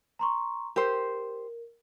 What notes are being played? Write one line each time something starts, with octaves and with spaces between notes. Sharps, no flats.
A#5 C6 C#6
G4 A#4 C5